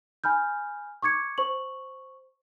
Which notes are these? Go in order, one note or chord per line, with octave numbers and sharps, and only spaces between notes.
G#5 B5 F6 G6
C#6 D6 G#6 C#7
C5 C#6 F#7